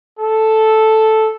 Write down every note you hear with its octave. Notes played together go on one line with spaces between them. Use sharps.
A4